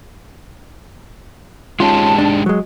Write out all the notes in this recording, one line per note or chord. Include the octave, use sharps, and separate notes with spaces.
G#3 C#4 D#4 F4 G4 A5
D4
F#3 G#3